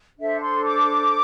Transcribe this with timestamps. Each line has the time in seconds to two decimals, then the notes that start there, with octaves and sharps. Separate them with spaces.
0.17 D4 A4 C5 E5
0.40 C6
0.64 D6